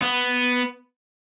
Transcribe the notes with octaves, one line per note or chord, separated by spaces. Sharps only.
B3